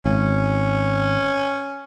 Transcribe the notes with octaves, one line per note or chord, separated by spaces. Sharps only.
G#1 C#4